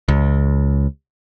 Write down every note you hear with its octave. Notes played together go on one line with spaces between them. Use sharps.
C#2